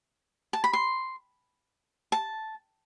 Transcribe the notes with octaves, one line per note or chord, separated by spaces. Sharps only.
A5
B5
C6
A5